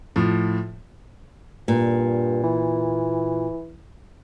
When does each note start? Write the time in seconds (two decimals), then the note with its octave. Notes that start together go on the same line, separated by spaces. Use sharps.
0.16 A2 F3
1.68 G2 A#2
2.44 E3